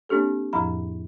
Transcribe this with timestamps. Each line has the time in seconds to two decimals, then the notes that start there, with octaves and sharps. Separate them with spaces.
0.09 A#3 C4 D4 G4 A4
0.53 F2 A2 F3 A#5 B5